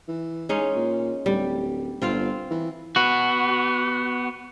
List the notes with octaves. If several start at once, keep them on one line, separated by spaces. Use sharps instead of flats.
E3
G#3 C#4 D#4
A#2
D1 G3
G1 C4 F4 F5
E3
B3 F#4